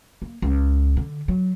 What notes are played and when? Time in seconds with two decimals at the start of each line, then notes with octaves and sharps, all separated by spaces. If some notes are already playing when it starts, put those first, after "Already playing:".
0.22 A#3
0.42 C#2
0.97 D3
1.28 F#3